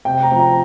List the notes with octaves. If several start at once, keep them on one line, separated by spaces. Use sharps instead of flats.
C3 G5
A#5
F3 C4
A#5